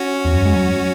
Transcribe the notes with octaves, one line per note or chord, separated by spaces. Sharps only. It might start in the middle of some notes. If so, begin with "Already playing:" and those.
Already playing: C#4 F#4
E2
F#2
G#3
F#3